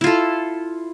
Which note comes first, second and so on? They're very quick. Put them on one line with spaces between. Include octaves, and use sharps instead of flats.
E4 F4 A4